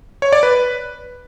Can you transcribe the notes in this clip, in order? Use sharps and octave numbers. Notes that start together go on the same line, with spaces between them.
C#5
D5
B4